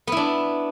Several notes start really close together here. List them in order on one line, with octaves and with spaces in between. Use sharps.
B3 E4 D4